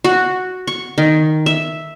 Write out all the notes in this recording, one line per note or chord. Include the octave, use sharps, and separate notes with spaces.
F#4
C#6
D#3
E5